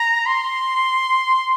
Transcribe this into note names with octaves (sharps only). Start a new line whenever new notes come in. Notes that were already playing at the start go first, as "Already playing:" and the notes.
Already playing: A#5
C6